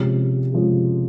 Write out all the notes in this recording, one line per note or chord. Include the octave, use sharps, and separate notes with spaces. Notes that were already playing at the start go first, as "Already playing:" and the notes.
Already playing: C3 F3 G#3 C#4
C3 F3 G#3 C#4